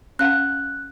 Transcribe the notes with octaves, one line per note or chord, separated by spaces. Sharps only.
C#4 F5 F#5 F#6